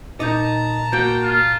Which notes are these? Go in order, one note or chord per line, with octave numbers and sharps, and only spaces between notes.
A#2 D#4 D#5 A5 A#5 G6
A#3 F#4 G5
F4